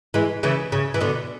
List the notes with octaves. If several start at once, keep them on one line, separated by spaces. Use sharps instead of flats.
E3 G#3
C#3 E3
C#3
E3
B2 D3